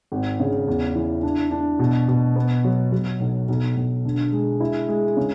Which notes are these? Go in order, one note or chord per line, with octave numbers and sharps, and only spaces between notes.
G#1
C#3
E2
E3
D4
D4
B2
B2
B3
F#3
F#3
B1
B1
B1
D3
G#3
E4
G#3
C#3